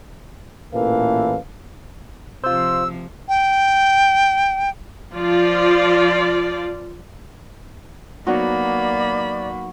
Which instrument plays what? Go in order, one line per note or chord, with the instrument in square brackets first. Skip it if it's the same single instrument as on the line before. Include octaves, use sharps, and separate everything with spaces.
[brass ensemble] A1 A#2 E3 A4 A#4 F5
[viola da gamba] C3 F3 [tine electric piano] F4 C5 [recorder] E6
[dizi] G5
[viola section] F3 F4 D5
[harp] F#3 B3 D#4 [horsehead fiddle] A#3 B5 [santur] F#4 [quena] D5